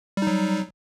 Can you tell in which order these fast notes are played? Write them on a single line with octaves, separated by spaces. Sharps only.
G3 D#4 F#3